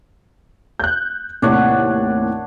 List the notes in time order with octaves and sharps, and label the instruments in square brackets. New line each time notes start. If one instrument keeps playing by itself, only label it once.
[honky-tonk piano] F#6 G6
[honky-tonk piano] D#2 A2 C3 [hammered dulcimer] D4 C#5 F#5